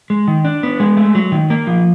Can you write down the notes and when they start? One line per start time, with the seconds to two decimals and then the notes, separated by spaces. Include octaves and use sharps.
0.10 G#3
0.28 D#3
0.45 D4
0.63 B3
0.80 G#3
0.97 A3
1.15 F#3
1.32 D#3
1.50 A#3
1.67 F3